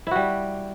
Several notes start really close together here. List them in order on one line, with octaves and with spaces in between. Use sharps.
E4 F#4 G3